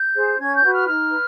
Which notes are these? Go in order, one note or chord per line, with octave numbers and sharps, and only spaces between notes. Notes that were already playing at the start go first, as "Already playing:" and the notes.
Already playing: G6
G#4 C5
C#4 G#6
G6
F#4 B4
F6
D#4 F6
B4